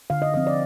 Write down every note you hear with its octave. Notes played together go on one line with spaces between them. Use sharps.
D3 F5
D#5
F3 C4 D#5
D5